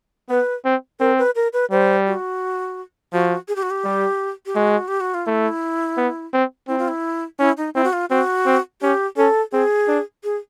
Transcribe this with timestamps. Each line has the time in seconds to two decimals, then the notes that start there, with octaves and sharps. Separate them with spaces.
0.29 B3 B4
0.65 C4
1.00 C4 A#4
1.18 B4
1.35 A#4
1.53 B4
1.71 G3 C5
2.07 F#4
3.13 F3 F#4
3.48 G#4
3.56 G4
3.63 F#4
3.70 G4
3.84 G3
4.46 G4
4.55 G#3 F#4
4.88 G4
5.00 F#4
5.14 F4
5.26 A3 E4
5.97 B3
6.33 C4
6.68 C4 E4
6.78 F4
6.88 E4
7.39 C#4 E4
7.57 D#4
7.75 C4 E4
7.84 F#4
7.93 F4
8.10 C4 F#4
8.46 C4
8.82 C#4 G4
9.17 C#4 A4
9.52 C4 G#4
9.88 D4
10.24 G#4